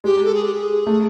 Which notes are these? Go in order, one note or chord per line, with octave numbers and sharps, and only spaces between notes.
G#3 G4
A4
G#4
G4
G#4
A3